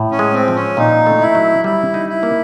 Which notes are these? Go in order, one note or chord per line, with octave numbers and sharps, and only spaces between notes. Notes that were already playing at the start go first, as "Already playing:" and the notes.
Already playing: A2
C#4
G#3
C4
F3
C#4
A#2 D#4
A3
E4
F#3
G3 E4
D#4
E4
A#3